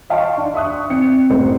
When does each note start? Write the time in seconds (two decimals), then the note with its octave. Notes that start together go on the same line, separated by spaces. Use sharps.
0.10 D#5 F5 G5 A5 C6 C#6
0.37 D4
0.54 E5 C#6 D#6 F#6
0.90 C4 D5 C#7
1.29 C2 F#2 A2 C5